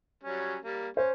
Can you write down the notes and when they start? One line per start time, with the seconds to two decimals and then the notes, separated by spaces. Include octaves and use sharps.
0.24 F#3 G3 C#4
0.62 G3 A#3
0.97 C#4 C5